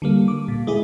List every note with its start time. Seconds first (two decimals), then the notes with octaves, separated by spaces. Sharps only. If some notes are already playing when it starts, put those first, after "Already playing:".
0.02 D3 G3 A#3
0.28 D6
0.48 A#2
0.67 G#3 E4 G#4